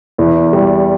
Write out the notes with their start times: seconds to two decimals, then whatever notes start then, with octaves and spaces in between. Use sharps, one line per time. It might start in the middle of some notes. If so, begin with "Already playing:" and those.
0.18 E2
0.53 G3